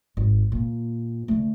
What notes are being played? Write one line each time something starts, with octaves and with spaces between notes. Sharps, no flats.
G#1
A#2
D3 A3